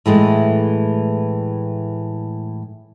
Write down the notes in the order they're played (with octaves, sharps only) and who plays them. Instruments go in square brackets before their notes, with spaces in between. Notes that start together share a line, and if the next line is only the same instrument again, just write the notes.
[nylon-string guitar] A2 E3 G#3 A3